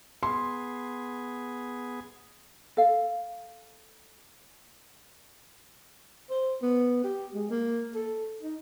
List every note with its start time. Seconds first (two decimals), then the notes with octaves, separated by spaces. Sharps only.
0.23 B3 G#4 C6
2.77 A4 F5
6.30 C5
6.62 B3
7.04 G4
7.34 G#3
7.50 A#3
7.95 A4
8.42 D#4